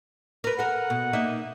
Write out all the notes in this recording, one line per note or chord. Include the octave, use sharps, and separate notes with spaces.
A#4 B4
A4 A#4 F#5
B2
A#3 D#4 E5